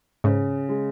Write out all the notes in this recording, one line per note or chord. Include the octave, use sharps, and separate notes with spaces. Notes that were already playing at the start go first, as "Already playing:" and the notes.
G#2 C#3
G#3